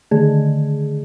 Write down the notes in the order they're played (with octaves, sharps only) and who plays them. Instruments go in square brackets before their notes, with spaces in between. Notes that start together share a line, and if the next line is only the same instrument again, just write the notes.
[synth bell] D3 D#3 A3 G#4